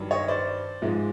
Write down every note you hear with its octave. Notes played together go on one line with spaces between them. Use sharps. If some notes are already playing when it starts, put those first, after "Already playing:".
Already playing: G2 D#3 F#3
C#5 D#5
C5 D5
G#2 F3 G#3